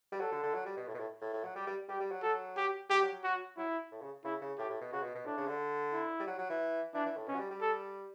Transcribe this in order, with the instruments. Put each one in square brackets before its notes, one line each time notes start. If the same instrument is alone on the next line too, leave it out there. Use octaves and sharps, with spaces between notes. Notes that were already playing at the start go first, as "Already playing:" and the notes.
[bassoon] G3
[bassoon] F#3 [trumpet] A4
[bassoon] D3
D3
F#3
G3
B2
A2
B2
A2
A2
A2
F#3
[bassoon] G3 [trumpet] G4
[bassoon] G3
[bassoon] G3 [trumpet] G4
[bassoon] G3
F#3
[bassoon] F#3 [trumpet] A4
[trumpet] G4
[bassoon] G3 [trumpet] G4
[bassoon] F#3
F#3
[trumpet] F#4
[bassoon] F#3 [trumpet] E4
[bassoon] A2
C#3
[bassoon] C#3 [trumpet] E4
[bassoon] C#3
[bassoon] A2 [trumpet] G4
[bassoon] A2
B2
[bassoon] C#3 [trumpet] F#4
[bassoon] B2
B2
[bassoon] A2 [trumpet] D4
[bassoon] C#3
D3
[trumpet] E4
[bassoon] G3
F#3
F#3
E3
[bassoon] E3 [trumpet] D4
[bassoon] E3
A2
[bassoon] B2 [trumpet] C#4
[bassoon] F#3
G3
G3
[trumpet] A4